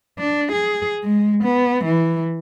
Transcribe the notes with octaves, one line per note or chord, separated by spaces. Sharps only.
D4
G#4
G#3
B3
E3